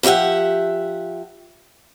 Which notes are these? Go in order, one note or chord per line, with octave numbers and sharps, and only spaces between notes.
F3 G4 D#5 E5 F#5